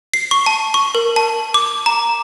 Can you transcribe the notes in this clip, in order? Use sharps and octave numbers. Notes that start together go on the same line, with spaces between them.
C7
C#6
A5
C#6
A#4
A5
D6
A#5